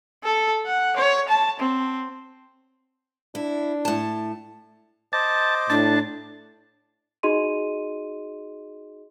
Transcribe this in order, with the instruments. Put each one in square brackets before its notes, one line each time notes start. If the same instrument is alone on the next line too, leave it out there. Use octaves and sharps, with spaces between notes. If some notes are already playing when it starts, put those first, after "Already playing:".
[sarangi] A4
F#5
C#5
A5
C4
[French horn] D4 [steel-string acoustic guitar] E4
[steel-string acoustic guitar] A2 A5
[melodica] C5 D#5 D6 [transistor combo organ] A5
[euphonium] A2 [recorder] D4 [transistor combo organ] A5
[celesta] D#4 F#4 G#4 D#5 C6 D#7